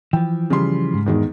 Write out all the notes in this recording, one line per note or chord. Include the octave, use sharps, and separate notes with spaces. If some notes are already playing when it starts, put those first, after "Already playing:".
E3 F3 G5
C#3 G3 C6
G#2
E2 D#3 G#3